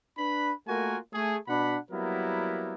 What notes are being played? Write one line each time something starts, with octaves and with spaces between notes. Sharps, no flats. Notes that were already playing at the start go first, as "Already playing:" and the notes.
D4 B4 B5
A3 A#3 F4 F#4 A#4 G#5
A3 G#4
B2 D4 F#5 B5
F#3 G3 A#3 B3 E4 A#4